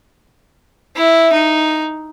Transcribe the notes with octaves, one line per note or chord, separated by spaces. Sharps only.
E4
D#4